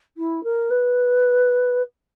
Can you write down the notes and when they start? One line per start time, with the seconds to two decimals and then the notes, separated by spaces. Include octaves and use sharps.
0.17 E4
0.43 A#4
0.70 B4